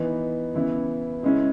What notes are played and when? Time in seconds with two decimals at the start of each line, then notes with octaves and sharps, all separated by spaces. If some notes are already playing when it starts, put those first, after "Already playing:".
Already playing: E3 B3 D#4
0.54 C#3 E3 B3 E4
1.23 C#3 G#3 C#4 E4